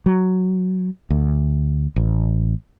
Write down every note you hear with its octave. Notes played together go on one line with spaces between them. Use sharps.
F#3
D2
A1